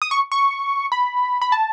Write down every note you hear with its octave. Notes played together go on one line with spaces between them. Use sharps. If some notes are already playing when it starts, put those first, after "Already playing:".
D#6
C#6
C#6
B5
B5
A5